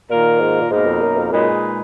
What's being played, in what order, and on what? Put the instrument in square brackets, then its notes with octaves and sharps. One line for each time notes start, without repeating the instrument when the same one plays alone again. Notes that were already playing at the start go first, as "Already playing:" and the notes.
[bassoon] A#2 [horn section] D#3 A#3 F4 A#4
[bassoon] G#2
A#2
[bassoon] G#2 [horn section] B2 A#3 D#4 A#4
[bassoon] F2
F#2
F2
[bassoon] F#2 [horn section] A#2 G#3 D#4 G#4 B4